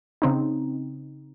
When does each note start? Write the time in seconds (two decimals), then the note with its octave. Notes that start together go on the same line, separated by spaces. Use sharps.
0.22 C#3 C4 D#4